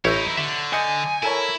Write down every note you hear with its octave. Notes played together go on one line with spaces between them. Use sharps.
A1 D#4 E4 C#5 C#6 E6 G6
D3 E5
D#5 G#5 G6 C#7
E4 A4 A#4 C#5